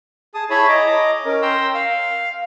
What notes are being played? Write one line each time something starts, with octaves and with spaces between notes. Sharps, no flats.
G#4 A5 D#6
E4 G#4 C#5 E5 A5 B5
D#5 A#5 D6
C#4 A#4
G5 A#5 C6 E6
F5